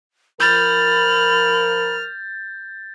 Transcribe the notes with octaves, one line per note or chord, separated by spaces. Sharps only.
F3 A#4 B5 F6 G6 A6